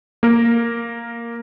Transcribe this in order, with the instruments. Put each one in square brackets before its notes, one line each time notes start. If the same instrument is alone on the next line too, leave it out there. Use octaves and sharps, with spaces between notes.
[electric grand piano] A#3 A#4